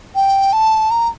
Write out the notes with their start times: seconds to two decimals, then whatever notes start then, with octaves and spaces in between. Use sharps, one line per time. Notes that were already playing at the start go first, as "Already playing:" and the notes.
0.15 G5
0.53 A5
0.91 A#5